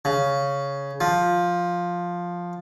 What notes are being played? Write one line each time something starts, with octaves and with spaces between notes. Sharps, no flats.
C#3
F3